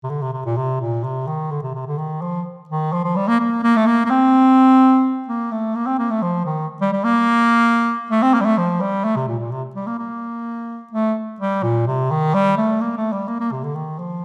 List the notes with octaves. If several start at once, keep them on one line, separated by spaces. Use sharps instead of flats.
C3
D3
C3
C3
A#2
C3
A#2
C3
D#3
D3
C3
C3
D3
D#3
F3
D#3
F3
F3
G3
A#3
A#3
A#3
A3
A#3
A#3
C4
A#3
A3
A#3
C4
A#3
A3
F3
D#3
G3
G3
A#3
A3
C4
A#3
G3
A3
F3
G3
A3
C3
A#2
A#2
C3
G3
A#3
A#3
A3
G3
A#2
C3
D#3
G3
A3
A#3
A3
G3
A#3
A#3
C3
D3
D#3
F3